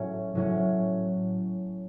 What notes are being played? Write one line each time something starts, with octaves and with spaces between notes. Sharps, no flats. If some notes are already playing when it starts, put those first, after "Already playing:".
Already playing: A2 F#3 C#4
A2 F#3 C#4